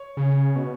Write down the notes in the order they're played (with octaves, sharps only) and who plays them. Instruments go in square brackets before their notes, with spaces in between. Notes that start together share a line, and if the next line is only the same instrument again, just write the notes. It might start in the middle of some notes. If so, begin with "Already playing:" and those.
Already playing: [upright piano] C#5
[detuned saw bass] C#3
B2